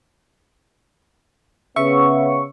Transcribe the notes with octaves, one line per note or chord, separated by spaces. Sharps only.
C#3 B3 E5 C#6